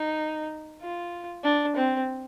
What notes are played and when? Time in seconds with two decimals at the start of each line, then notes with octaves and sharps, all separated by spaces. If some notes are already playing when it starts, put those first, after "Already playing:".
Already playing: D#4
0.81 F4
1.44 D4
1.76 C4